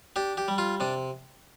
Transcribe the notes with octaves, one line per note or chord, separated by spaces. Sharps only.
D4 G4
G4
G3
F4
C3 D4